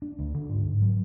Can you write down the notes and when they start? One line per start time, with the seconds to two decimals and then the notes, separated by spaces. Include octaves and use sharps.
0.02 D4
0.19 D2
0.34 D3
0.49 G#2
0.65 G#2
0.82 F#3